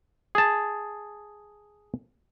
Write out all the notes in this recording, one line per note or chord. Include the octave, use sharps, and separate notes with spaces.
G#4 A5